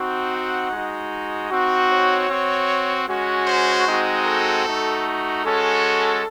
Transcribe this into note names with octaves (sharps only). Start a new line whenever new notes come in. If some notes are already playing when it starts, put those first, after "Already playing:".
Already playing: C4 D#4 F#4
F#5
G#3 D#4 F#4
C4 D#4 F#4
C#5
C4 F#4
G#3 C#4 F#4
C5
G#3 C4 D#4 F#4
A4
A3 D#4 F#4
G#3 C#4 F#4 A4